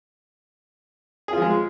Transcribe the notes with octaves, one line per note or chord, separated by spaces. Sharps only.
F3 G#3 F4 G#4